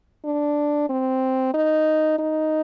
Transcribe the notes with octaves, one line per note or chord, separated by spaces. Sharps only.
D4
C4
D#4
D#4